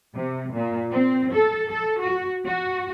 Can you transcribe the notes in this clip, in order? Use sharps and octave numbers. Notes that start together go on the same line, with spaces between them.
C3
A#2
C4
A4
A4
F#4
F#4